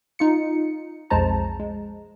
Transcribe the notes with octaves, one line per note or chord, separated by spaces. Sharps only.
D#4 F4 C#7
B1 F2 G#3 C5 A5 A#5
G#3